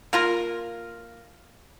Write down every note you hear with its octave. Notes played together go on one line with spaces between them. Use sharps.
A#3 F4 A#4